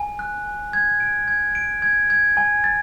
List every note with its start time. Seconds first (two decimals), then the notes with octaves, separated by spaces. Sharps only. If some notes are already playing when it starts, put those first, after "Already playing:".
Already playing: G#5
0.19 F#6
0.46 G#5
0.73 G#6
1.00 D7
1.28 G#6
1.55 D7
1.82 G#6
2.10 G#6
2.37 G#5
2.64 A6